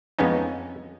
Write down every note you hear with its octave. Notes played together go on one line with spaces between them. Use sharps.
F2 G#3 B3 C#4 D#4